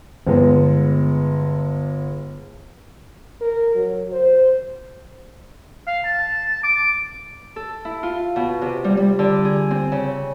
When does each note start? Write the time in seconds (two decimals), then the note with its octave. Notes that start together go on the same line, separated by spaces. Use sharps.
0.27 G1 G#3 B3
3.41 A#4
3.75 F#3
4.12 C5
5.87 F5
6.05 A5
6.63 D6
7.56 A4
7.85 E4
8.03 F4
8.36 B2
8.62 C3
8.84 G3
8.97 G3
9.19 D3
9.45 G#4
9.71 C4
9.92 C#3